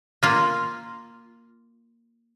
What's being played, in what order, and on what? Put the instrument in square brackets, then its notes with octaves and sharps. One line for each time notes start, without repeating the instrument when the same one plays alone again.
[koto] A#3 F4